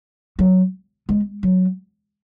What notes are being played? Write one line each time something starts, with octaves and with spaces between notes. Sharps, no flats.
F#3
G#3
F#3